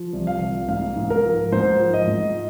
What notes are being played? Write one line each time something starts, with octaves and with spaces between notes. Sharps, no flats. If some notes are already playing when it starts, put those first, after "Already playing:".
Already playing: F3
C2
F5
C2
G#2 F5
G#2
A#4
F3
G#2 C5
F3
D#5
G#2